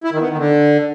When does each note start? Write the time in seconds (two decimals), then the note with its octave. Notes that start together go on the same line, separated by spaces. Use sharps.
0.04 E4
0.12 D#3
0.21 B3
0.29 D#3
0.37 D3